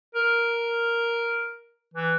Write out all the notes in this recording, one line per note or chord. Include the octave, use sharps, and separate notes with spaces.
A#4
E3